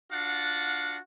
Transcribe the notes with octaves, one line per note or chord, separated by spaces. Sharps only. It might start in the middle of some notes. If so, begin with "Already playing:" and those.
D4 F4 F#4 F5 F#5